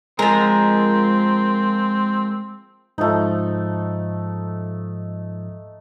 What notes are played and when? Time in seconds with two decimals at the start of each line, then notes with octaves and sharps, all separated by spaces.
0.19 F3 G#3 C4 G#4 A#4
2.98 G#2 F3 A3 D#4